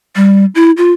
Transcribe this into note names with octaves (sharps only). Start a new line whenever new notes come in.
G3
E4
F4